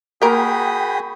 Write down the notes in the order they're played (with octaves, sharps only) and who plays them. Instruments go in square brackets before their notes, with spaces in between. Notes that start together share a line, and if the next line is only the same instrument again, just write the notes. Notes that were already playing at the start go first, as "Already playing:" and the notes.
[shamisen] A#3 A#4 [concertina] F#4 G#4 D#6 [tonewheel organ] G5 B5